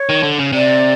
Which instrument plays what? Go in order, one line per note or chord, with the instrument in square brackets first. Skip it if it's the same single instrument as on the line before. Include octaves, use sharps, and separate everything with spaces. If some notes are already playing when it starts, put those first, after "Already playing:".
Already playing: [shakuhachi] C#5
[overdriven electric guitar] D#3
D3
C#3
[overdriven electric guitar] C3 [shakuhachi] D5